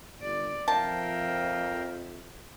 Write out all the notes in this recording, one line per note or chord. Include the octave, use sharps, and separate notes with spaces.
G1 D5
F2 F3 A#4 E5 F5 G5 A5